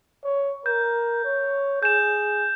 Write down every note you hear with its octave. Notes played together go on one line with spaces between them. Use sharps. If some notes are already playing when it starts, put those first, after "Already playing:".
C#5
A#4 G6
C#5
G#4 G6 E7